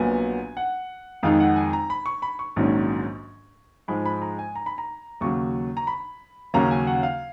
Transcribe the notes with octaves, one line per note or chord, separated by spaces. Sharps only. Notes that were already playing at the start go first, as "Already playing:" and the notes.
Already playing: A#1 A#2 F#3 B3 G#5
F#5
F2 D#3 G#3 D#4 F5
F#5
G#5
A#5
B5
C#6
B5
C#6
A#1 G#2 D#3 F#3 C#4
G#2 F3 G#3 B5
B5
A#5
G#5
A#5
B5
A#5
D#2 C#3 F#3 C#6
A#5
B5
D#2 C#3 F#3 A#3 C#4 A#5
G#5
F#5
F5